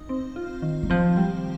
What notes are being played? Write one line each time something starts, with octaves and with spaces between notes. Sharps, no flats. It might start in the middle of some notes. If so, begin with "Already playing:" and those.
Already playing: D#4
C4
F4
D#3
G3
F3 C4
G3